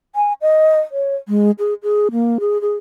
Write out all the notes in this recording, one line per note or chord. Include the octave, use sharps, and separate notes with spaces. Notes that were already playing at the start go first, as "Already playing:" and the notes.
G#5
D#5
C#5
G#3
G#4
G#4
A#3
G#4
G#4